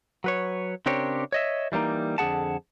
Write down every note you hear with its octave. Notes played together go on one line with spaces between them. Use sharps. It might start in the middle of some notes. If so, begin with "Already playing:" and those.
F#3 B4 C#5
C#3 C4 D4 G4 A#4 C#5
C#5 D#5 E5
E3 G3 A3 A#3 D#4
F2 D3 A3 G#4 F#5 A5